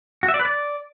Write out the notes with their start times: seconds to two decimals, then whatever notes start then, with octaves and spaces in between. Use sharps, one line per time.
0.23 F#4
0.28 E5
0.34 D5
0.40 B4
0.45 D5